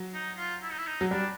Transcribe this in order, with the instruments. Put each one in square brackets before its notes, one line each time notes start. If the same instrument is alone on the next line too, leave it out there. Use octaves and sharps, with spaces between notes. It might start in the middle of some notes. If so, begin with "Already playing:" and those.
Already playing: [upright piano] F#3
[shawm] D#4
F4
E4
D#4
E4
D#4
[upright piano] F#3
[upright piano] G3 [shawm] D4